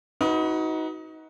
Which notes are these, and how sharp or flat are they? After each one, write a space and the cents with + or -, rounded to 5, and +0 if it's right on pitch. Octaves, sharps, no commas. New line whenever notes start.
D#4 +25 F#4 +0 B4 +0